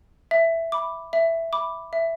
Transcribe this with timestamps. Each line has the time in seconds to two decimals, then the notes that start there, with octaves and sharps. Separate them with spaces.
0.31 E5
0.72 B5 D6
1.13 E5
1.53 B5 D6
1.93 E5